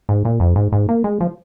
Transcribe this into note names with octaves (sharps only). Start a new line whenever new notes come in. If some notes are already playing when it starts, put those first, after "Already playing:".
G#2
A#2
F2
G#2
G#2
A#3
G#3
F3